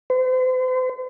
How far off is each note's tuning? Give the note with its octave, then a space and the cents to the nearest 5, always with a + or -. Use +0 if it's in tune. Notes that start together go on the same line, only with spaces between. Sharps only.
C5 -40